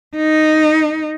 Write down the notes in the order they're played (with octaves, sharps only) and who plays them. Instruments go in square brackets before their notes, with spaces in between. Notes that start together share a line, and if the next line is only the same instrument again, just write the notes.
[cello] D#4